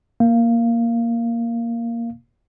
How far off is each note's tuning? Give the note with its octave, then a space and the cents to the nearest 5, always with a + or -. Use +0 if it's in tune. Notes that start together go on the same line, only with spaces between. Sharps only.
A#3 +0 F5 -15